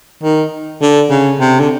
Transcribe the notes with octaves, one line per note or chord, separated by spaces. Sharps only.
D#3
D3
C#3
C3
D3